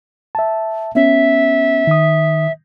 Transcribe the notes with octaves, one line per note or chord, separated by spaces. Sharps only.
E5 A5
B3 C#4 E5
D#3 D#6